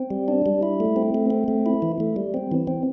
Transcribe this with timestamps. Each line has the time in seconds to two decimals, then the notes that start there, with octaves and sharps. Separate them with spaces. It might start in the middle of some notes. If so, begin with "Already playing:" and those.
Already playing: C4
0.11 G3
0.28 D4
0.46 G3
0.63 E4
0.80 A3
0.96 C4
1.14 A3
1.30 C4
1.48 A3
1.66 E4
1.82 E3
2.00 A3
2.16 G3
2.34 C4
2.52 E3
2.67 C4